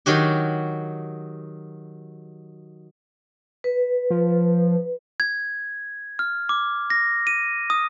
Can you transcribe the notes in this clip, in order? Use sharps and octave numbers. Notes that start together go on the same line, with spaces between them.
D#3 F#3 F#4 G4
B4
F3
G#6
F6
D6
A#6
D#7
D#6